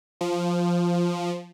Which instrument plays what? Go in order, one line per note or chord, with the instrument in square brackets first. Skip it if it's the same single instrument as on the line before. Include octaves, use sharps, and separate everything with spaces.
[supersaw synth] F3